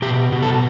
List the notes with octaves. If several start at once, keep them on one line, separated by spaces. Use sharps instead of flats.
B2 G4
B2
A4